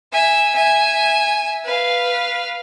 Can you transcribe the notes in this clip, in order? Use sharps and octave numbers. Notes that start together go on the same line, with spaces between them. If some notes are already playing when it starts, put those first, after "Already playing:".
E5 G#5
E5 G#5
B4 F5